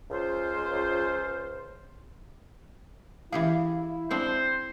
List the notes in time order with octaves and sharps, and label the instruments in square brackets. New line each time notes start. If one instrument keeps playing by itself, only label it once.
[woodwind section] C#2 F4 C5
[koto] E3 G4 G#4 [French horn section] E4 [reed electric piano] F5
[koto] G#3 C4 D4 [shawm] C5